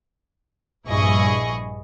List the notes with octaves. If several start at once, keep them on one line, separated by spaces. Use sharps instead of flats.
A#1 G2 E4 G#4 D#5 C#6